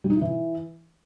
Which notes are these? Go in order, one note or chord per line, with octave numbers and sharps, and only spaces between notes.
G3
D#4
E4
E3